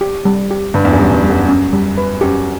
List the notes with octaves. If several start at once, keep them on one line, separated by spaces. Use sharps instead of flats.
G4
G3
G4
G2 B4
E2
F#2
G3
G2
G3
F#2
C#4
G3
B4
F#2 G4